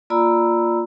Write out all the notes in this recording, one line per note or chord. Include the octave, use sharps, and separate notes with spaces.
A#3 F4 D5 A#5 B5 E6